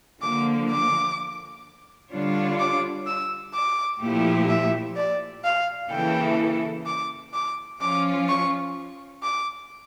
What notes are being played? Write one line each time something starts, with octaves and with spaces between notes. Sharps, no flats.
D3 F3 A#3 D6
D6
D3 G3 D4 F4 C#5
D6
E6
D6
A#2 F3 A3 E4 G4
E5
D5
F5
C#3 E3 A#3 E4 A4 G5
D6
D6
F3 C#4 F4 D6
C#6
D6